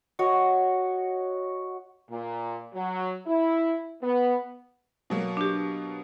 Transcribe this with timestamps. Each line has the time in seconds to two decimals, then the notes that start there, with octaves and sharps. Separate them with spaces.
0.19 F#4 C#5 D#5
2.09 A#2
2.74 F#3
3.26 E4
4.02 B3
5.10 B2 F#3 A#3
5.37 D4 G4